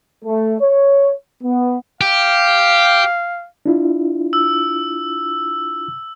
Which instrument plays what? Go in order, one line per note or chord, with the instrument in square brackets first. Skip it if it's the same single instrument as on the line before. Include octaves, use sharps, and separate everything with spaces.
[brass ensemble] A3
C#5
B3
[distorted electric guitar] G4 [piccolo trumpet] F5
[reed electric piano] D4 E4 F4
[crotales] E6